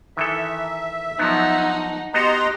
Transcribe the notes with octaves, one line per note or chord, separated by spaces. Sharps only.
D#3 E3 A4 E5
F3 F#3 B3 D#4 F#5
B3 D#4 F#4 G4 D#5 A#5 C6